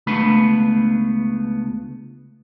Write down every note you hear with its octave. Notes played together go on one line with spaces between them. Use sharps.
C#2 A3 B3 D4 B5